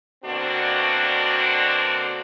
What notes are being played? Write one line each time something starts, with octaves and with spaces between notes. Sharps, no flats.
B2 D3 A#3 C4 D4 F#4